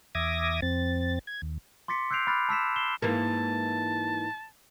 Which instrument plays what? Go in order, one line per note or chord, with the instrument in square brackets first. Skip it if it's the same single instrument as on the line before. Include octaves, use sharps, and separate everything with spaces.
[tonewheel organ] E2 E5 D6 D#6 G#6 A#6
F2 C4 A6
G#6
D#2
[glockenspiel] C6 D6 A6 B6 C#7
E6 F#6 G6 C7 D7 F7
B5 D6 F6 F#6 A6
A5 E6 B6 E7
C7 E7 G7
[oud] G#2 E3 A#3 [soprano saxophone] A5